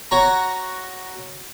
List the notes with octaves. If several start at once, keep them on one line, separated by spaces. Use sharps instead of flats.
F#4 C#5 A#5